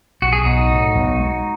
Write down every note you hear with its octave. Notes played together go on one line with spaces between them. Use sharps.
B1 F#4
G#4
B1 D#4 F#4
A2
B1
G#3